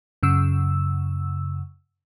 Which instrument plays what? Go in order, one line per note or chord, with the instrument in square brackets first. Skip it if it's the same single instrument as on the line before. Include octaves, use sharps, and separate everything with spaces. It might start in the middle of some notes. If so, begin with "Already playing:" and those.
[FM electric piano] F#2 C#3 E6